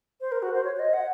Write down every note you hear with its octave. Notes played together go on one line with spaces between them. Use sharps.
C5
A#4
F#4
C5
C#5
C#5
D#5
F#5